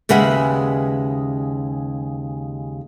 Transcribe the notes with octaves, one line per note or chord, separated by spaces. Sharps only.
D#2 C#3 G#3 B4 E5 F#5